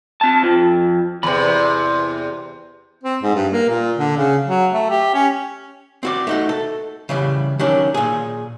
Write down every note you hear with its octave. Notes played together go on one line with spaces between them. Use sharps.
C4 A5
F2 F3
E2 C3 B5
C4
G#2
G2
A#3
A#2
D3
C#3
F#3
A3
G4
C#4
C4 F#4 D5
A3 D#4 F#4
A4
C#3 E3 G3
D#3 F#3 C#4 D4
A#2 G#4